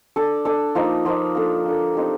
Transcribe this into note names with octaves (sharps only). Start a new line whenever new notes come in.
D4 A4 D5
D4 A4 D5
F3 A#3 D#4
F3 A#3 D#4
A#3 D4 A4
A#3 D4 A4
C4 D#4 G4 D5